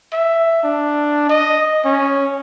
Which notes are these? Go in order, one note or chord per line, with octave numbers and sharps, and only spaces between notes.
E5
D4
D#5
C#4